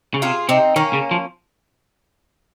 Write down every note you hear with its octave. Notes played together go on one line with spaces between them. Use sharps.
C#3
C3 F4 G#4
C3 C4 D#4
D#3 A#3 C#4
C#3
F3